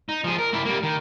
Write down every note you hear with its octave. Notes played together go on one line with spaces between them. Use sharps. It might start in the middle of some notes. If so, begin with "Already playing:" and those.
D#4
F3 G#4
A#4
A#3 E4
G3 A#3
D#3